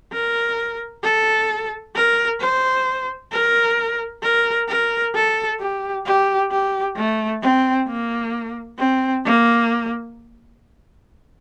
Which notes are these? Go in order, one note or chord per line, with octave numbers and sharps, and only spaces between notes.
A#4
A4
A#4
C5
A#4
A#4
A#4
A4
G4
G4
G4
A3
C4
A#3
C4
A#3